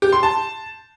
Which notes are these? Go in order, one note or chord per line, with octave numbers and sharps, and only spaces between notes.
G4
C6
A5